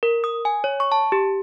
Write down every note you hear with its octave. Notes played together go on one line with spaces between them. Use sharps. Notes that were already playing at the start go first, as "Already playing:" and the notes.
A#4
D#6
G#5
C#5
C#6
A5
G4